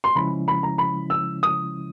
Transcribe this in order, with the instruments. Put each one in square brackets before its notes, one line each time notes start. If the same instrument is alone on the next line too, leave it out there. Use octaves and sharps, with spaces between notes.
[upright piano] C6
[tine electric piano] C#3 F3 G#3 C#4 E4 [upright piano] B5
[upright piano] B5
A#5
B5
E6
D#6